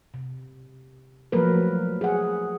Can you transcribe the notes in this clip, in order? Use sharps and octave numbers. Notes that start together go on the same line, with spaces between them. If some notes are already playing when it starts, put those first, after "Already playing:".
C3
F3 F#3 A3 A#3 A#4 B4
G#4 F#5